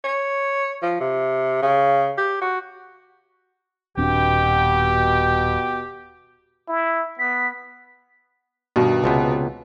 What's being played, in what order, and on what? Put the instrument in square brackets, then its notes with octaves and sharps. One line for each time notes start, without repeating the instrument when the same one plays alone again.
[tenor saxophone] C#5
F3
C3
C#3
G4
F#4
[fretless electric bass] D#1 C4 D4 [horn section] B2 G5 [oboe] G4
[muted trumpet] E4
[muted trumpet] B3 [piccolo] B6
[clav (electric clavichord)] G2 D#3 [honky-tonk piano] B2
[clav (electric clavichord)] C#2 C3 B3